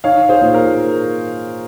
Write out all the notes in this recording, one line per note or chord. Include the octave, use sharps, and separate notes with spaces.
D#4 C#5 F5
G#4 C5
A#2
A#4